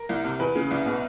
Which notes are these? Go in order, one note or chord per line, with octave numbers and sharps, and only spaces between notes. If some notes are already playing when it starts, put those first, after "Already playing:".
Already playing: A#4
C2
C3
E2 B4
C#3
C2
B2